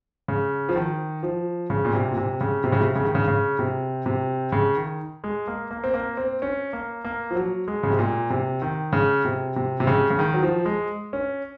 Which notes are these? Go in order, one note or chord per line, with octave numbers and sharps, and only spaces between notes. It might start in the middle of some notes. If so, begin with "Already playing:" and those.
C#3
F3
D#3
F3
C#3
A#2
C3
A#2
C3
C#3
C3
C#3
C3
C#3
D#3
C#3
C#3
C3
C3
C#3
D#3
G#3
A#3
A#3
C4
A#3
C4
C#4
A#3
A#3
F3
F#3
G#3
C#3
C3
A#2
C3
D#3
C#3
C3
C3
C3
C#3
C#3
D#3
F#3
F3
G#3
C#4